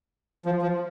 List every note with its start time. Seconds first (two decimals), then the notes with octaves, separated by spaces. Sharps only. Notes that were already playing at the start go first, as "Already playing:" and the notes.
0.46 F3
0.62 F3